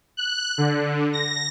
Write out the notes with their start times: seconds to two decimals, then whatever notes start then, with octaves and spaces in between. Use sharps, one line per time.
0.17 F#6
0.58 D3
1.13 A#6